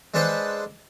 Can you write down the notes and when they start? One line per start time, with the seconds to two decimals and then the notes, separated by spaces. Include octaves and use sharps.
0.14 G#3 D4 A4 B4 C5 F#5